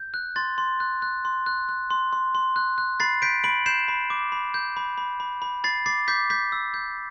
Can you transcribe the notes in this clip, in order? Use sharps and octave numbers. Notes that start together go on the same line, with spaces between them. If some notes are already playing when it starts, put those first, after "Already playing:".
Already playing: G6
F#6
C6 A6
C6
F#6
F#6
C6
F#6
F#6
C6
C6
C6
F#6
F#6
B5 A6 C7
G6 B6 D7
B5 D7 F#7
G6 C7 E7
B5
D6
B5
G6
B5
B5
B5
B5
B5 A6 C7
D6 A6 C7
D6 G6 B6
D6 G6 B6
E6
G6